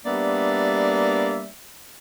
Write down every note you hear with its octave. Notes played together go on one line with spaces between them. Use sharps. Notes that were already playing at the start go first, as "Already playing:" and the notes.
G3 A#3 B3 D4 D5 E5